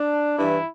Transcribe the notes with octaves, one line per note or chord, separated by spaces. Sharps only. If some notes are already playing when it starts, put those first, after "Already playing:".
Already playing: D4
G2 E3 E4